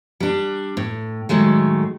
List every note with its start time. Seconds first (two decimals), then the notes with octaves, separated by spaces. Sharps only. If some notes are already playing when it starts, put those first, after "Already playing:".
0.20 G3 D4
0.77 A2
1.29 A2 D#3 F#3 G#3 A3